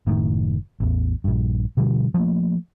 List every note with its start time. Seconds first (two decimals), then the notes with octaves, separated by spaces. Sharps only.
0.07 F#1 A2 D#3
0.80 A1 E2
1.24 A#1 G2
1.77 B2 D3 F3 G3
2.14 F3 G3 A3 A#3